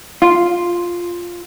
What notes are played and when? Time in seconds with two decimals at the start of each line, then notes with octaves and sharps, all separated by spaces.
0.22 F4